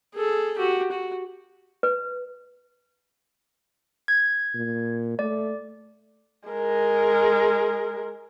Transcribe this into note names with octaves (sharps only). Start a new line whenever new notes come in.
G#4 A4
F#4 G4
F#4
B4
G#6
A#2
A3 D5
G#3 A#4